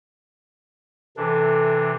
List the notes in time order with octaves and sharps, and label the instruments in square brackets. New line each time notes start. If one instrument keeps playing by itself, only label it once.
[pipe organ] C3 E3 D4 [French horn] A4